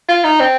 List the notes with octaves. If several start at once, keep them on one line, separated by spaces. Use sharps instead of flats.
F4
D#4
C4